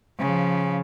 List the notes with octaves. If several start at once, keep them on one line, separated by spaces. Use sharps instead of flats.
C#3 F3